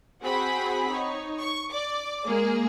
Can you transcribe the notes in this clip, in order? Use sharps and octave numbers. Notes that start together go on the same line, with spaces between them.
C4 F#4 G#4 F#5 B5
D#4 C#5
C#6
D5 D6
G#3 A#3 G#4